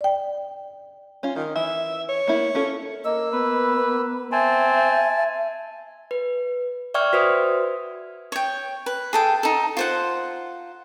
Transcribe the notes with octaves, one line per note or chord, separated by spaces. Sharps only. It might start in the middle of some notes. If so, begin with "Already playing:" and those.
D5 G5
C#4 F4
D#3 F4
E3 E5
C#5
A#3 B3 E4
C#4 F4 A4
A#3 D#5 E6
B3 B4
C4 E5 G#5 A5
B4
D5 E5 G5 C#6 F6 G#6
F#4 B4 C5 E5 D#6
C#5 G5
B4
G#4 A4 G5
D#4 A4
F4 C5 F#5